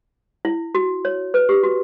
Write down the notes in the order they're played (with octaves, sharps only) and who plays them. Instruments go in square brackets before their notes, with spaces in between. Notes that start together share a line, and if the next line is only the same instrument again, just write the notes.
[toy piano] E4
F#4
C#5
B4
G4
F#4